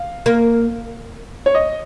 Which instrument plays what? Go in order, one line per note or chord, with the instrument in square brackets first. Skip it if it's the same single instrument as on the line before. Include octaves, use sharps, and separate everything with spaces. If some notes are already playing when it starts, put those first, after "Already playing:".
Already playing: [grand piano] F5
[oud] A#3
[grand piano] C#5
D#5